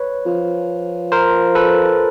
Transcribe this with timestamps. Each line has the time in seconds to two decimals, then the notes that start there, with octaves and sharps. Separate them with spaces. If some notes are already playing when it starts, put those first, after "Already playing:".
Already playing: B4 C#5
0.26 F3
1.12 A#4 C5
1.55 A4 B4